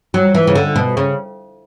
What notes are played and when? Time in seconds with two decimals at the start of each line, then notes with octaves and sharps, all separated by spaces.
0.14 F#3
0.35 E3
0.47 C#3
0.55 D3
0.76 B2
0.97 C#3